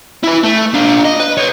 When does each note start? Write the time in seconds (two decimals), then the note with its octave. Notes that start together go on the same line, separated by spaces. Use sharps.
0.23 E4 B4
0.44 A3
0.74 D4 F4
1.05 D#5
1.20 B4
1.37 B4 C#5